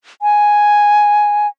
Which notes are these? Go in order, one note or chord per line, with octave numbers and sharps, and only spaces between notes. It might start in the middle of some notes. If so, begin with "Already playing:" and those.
G#5